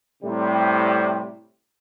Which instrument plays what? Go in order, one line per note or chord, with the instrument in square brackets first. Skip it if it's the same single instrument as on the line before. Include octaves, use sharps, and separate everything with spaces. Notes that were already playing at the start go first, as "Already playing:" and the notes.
[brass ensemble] A2 C3 G3